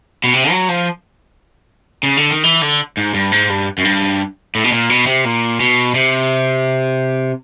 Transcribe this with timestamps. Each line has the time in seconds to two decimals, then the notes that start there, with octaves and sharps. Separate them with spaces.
0.24 B2
0.34 C3
0.51 F#3
0.69 F3
2.03 C#3
2.17 D3
2.30 D#3
2.43 E3
2.62 D3
2.97 G#2
3.14 G2
3.32 G#2
3.49 G2
3.78 F#2
3.85 G2
4.55 A2
4.64 B2
4.72 A#2
4.90 B2
5.07 C3
5.25 A#2
5.60 B2
5.94 C3